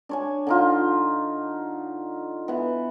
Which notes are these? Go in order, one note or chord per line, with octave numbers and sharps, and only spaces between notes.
D4 C#5 G#5
D3 D#4 F4
E3 B3